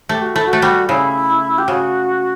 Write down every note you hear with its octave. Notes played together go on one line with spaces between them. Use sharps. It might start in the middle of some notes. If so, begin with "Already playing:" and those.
A3 G4
F#4
A3 E4
F#4
A3
G3
C#3 E4
G4
C#3 F#4